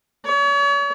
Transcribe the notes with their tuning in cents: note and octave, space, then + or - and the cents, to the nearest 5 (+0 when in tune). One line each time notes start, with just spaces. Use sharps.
C#5 +40